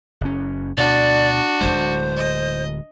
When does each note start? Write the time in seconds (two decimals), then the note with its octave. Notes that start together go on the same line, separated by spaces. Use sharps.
0.21 F#1 C#4
0.77 D2 B2 D4 F#4 D5
1.61 D1 C2 G#3 C5
2.17 D#5